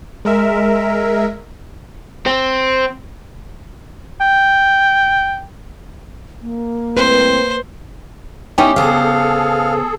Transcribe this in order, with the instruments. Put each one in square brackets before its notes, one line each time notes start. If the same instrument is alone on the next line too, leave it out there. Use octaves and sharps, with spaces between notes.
[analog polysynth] G#3 A#4 E5
[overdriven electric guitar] C4
[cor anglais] G5
[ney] A#3
[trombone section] A2 G3 C4 [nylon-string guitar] B4 [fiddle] C5
[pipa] G3 C#4 G4 [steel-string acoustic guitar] B3 D#4 E4
[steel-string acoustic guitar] C#3 B3 C5 [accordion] G#4 A4 [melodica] F5